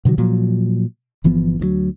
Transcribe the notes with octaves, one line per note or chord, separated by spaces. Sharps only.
B2 D3 D#3 F#3
A#2 F3 F#3
G1 E3 F3 B3
D2 D#3 F#3